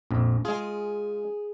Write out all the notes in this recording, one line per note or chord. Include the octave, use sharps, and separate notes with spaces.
A#1 F2
G#3 F4 G#4